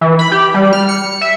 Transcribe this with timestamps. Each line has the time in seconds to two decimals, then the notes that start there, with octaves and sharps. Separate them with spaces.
0.01 E3
0.19 B5
0.32 G4
0.54 G3
0.73 F6
0.89 C#7
1.21 E5